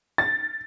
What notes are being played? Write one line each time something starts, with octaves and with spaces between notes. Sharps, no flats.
A6